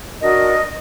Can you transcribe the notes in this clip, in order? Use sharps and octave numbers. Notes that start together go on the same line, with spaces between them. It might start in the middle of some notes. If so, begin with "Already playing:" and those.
D4 F#4 A#4 D#5